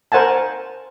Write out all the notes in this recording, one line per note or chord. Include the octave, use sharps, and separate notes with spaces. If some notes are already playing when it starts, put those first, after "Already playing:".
A#4 C5 F#5 G#5 A5